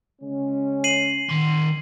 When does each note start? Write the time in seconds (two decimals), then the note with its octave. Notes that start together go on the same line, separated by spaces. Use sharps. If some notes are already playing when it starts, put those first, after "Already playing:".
0.22 C#3 G#3 C#4
0.84 C7 D#7 F#7
1.30 D#3 C6